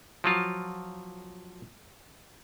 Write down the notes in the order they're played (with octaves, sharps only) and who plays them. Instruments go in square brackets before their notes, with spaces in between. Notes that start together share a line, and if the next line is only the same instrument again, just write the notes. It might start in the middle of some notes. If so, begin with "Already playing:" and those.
[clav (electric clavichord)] F3 F#3 F4